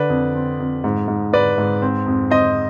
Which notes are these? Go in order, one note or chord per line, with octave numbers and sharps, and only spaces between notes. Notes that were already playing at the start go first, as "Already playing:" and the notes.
Already playing: D3 B4 D5
F2
C4
F2
G#2
G#2
G#2 B4 D5
G#2
C4
F2
C4 C5 D#5